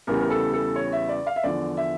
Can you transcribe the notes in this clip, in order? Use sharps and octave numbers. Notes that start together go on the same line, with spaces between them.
E2 C#3 E3 G3 A#4
A#4
A4
A4
C#5
E5
D5
F5
E5
E2 D3 F3 D5
E5